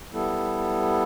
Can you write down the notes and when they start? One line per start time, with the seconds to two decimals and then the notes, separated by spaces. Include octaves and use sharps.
0.12 G3 B3 E4 A4